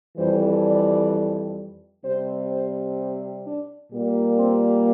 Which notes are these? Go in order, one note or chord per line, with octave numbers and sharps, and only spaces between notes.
F2 E3 G3 C5
D5
C3 G3 C4 C5
C5
D4
A#2 G3 A#3
C4